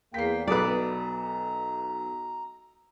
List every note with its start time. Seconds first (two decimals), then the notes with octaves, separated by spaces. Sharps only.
0.14 E2 A#3 G5 B6 C7
0.48 B1 A4 B4 D5 A#5 D#6